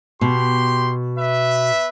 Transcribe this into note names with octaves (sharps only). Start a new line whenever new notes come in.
B2 G4 C6
B4 E5